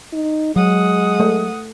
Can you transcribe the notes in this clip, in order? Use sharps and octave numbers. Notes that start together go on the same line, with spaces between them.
D#4
F#3 G#3 F#5 D#6
A3